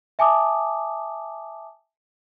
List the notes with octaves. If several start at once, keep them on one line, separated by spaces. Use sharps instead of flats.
E5 G#5 A5 D6 D#6